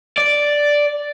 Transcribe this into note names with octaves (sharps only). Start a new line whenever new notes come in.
D5